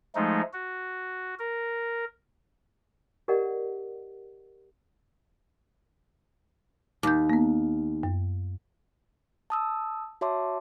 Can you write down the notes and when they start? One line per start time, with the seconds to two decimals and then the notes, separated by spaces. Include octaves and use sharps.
0.15 F3 G#3 A3 D#4
0.53 F#4
1.39 A#4
3.28 G4 A#4 D5 D#5 F#5
7.03 D#2 D6 G6
7.30 A#3 B3
8.03 F#2
9.50 A5 D#6 E6
10.21 F#4 C#5 E5 A5 C6 D6